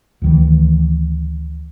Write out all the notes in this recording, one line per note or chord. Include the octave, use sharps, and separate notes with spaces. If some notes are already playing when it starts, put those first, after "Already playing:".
D2 D#3 E3